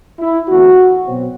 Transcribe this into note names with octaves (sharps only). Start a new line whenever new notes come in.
E4
E2 D3 A3 C4 F#4
B2 F#3 C4